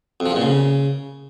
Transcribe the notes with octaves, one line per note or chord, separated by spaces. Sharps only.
F2
F3
E2
A#2
C#3